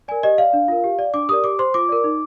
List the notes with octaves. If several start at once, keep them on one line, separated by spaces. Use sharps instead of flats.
A#4 D5 G#5
G4 D#5
D5 F5
D4
F4 A#4
G4
D5
D4 D6
G4 A#4 D5 D#6
G4 D6
C5 C6
F4 D6
A#4 D5
D#4